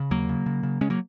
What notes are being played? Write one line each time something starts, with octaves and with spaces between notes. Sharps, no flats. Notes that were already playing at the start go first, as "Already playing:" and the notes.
Already playing: C#3
D#2 F#3 A#3
C#3
C#3
C#3
C#3 G#3 C#4
F#3 A#3